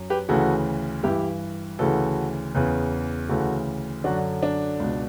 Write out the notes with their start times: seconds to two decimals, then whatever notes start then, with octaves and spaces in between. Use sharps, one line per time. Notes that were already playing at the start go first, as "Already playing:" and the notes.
Already playing: F#2
0.10 G4 B4
0.29 D2 C#3 E3 F#4 A4
1.03 G2 E3 E4 G4
1.79 D2 C#3 E3 F#4 A4
2.55 E2 C#3 E3
3.29 D2 C#3 E3 F#4 A4
4.04 F#2 D3 D4 F#4
4.43 D4
4.80 C#2 B2